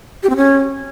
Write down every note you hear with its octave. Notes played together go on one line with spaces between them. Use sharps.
G4
C4
C#4